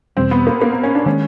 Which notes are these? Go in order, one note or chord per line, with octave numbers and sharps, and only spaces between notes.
E2 B2 G3 C4
B3
A#3
A#3
B3
C#4
D4
D#3 G#3 C#4